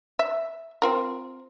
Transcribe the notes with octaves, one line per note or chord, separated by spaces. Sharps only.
E5
C4 F4 A#4